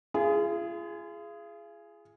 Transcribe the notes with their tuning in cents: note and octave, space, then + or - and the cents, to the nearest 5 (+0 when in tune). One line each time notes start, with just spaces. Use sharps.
F4 -40 G#4 +0